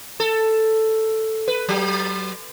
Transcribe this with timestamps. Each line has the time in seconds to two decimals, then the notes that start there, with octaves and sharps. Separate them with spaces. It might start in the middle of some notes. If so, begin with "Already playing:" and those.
0.20 A4
1.48 B4
1.68 F#3